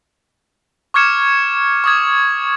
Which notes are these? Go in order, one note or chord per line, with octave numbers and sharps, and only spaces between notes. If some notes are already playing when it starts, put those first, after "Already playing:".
C#6 D6 F6 G#6 C#7 E7
C#6 D#6 G#6